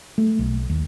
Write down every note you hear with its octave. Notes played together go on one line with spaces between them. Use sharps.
A3
B1
D#2